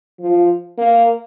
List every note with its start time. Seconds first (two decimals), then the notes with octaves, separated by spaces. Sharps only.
0.19 F3
0.78 A#3